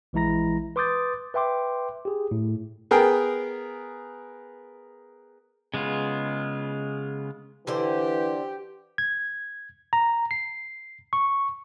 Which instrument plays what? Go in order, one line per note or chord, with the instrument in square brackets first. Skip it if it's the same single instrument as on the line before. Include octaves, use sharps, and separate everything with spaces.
[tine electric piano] A#1 E3 G#3 E4 A#5 A#6
B4 C6 D6 D#6 G6 A6
B4 E5 G5 C6 D6
G4 G#4
A2
[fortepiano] B3 G#4 A#4 G5
[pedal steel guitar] C#3 G#3 B3 F4
[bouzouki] D3 C5 [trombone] E3 [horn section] G4
[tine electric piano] G#6
A#5
C7
C#6